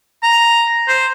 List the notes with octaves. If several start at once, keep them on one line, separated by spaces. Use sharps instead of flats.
A#5
C5